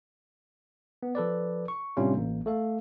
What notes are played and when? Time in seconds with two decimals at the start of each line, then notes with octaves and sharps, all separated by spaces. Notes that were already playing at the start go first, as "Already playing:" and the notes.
1.03 B3
1.15 F3 A4 B4 D5
1.68 C#6
1.97 A2 C3 G3 C#4 D4 F4
2.14 A1 A#3
2.46 A3 A4 F5